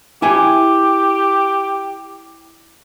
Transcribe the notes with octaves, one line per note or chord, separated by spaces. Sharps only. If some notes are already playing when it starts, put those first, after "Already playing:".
E4 G4 G#5